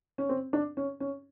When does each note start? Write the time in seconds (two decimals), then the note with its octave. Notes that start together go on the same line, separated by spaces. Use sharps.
0.18 C#4
0.29 C4
0.53 D4
0.77 C#4
1.00 C#4